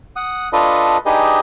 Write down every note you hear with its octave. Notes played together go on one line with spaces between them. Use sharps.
F#5 D#6
D4 F4 A4 B4 D#5
D4 D#4 G4 G#4 B4 D#5